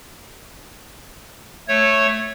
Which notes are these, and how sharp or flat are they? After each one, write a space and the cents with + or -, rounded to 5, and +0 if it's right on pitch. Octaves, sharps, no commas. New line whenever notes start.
A3 +0 C#5 -10